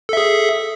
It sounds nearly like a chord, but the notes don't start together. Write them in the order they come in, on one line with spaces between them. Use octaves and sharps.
A4 E5 G#4